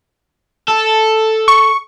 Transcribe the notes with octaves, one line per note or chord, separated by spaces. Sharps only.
A4
C#6